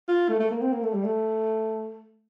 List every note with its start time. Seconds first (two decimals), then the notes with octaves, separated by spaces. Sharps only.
0.08 F4
0.29 A3
0.40 A3
0.51 A#3
0.61 C4
0.72 A#3
0.83 A3
0.94 G3
1.04 A3